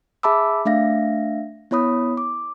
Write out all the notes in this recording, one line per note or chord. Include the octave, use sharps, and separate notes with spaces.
G#4 E5 A5 B5 D6 E6
A3 D4 E5 F5 A#6
B3 E4 C#5 B5 D#6
D6